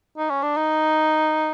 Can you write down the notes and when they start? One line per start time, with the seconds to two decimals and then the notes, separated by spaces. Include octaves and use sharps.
0.18 D#4
0.30 C#4
0.43 D4
0.57 D#4